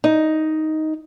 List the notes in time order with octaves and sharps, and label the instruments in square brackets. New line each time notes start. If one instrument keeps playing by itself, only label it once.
[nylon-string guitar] D#4